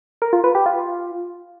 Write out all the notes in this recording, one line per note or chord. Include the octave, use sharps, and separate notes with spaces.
A#4
F4
B4
G4
F4